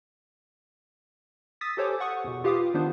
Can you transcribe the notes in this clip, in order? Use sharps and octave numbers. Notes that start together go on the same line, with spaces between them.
D#6 E6 A6 B6
G4 A4 C5 C#5 G#5 D6
F#5 C#6 D#6
E2 B2
F4 G4 B4 F5 D6 D#6
D#3 B3 D4 C5